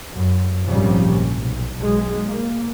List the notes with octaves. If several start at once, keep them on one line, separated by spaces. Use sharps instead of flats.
F#2
A#1 G#2 C3 F3 G3 C#4
B1
B1 G#3
A#3